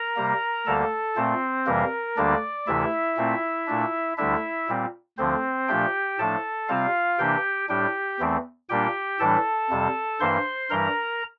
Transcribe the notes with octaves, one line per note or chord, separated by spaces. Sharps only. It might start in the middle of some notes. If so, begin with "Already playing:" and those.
Already playing: A#4 A#5
C3 G3 A#3
D2 D3 G3 A#3 A4 A5
A#2 A3 C4 C5
F2 C3 E3 G3 A#3 A#4
D2 D3 G3 A#3 D4 D5
D2 C3 E3 A3 E4 E5
A#2 A3 C4
A#2 A3 D4
D2 D3 G3 D4 E4 E5
A#2 G3 C4
D2 D3 F3 C4 C5
A#2 F3 A3 D4 G4 G5
A2 F3 A3 D4 A4 A5
C3 G3 C4 F4 F5
C3 E3 A#3 D4 G4 G5
A2 G3 D4 G4 G5
E2 E3 A3 C4
A#2 G3 A#3 D4 G4 G5
A2 E3 G3 D4 A4 A5
F2 C3 G3
G2 E3 A#3 C5 C6
G2 E3 G3 A#4 A#5